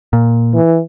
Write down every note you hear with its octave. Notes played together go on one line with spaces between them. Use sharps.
A#2
E3